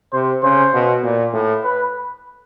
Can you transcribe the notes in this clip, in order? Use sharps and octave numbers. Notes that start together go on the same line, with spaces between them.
C3 C5
C#3 C5
B2
A#2
A2
B4